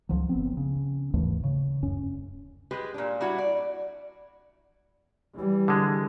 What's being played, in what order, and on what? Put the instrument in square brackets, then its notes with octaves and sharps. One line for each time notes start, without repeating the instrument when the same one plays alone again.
[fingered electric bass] C#2 F3 F#3
F#1 B3 C4
C#3
D#2 G#2 E3 A3
C#3
D1 F#2 C#4
[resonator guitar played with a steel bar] G#3 G4 B4
A#2 D4
G3 D4 E4 F#4
D5
[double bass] E3 G3
[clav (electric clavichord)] D3 G#3